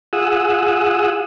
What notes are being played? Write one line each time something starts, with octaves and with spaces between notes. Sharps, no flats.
F4 G#4 F#5 D#6 E6